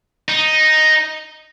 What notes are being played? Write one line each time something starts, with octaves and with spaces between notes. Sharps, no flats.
D#4